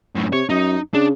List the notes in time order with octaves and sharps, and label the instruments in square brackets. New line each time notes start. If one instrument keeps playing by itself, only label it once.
[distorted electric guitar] F#2 A2
[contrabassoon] C3 [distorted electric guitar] C#5
[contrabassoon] F#2 [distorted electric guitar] D#4
[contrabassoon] C#3 [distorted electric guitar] D4